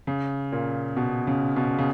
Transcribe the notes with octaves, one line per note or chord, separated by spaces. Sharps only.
C#3
A#2
B2
C#3
B2
C#3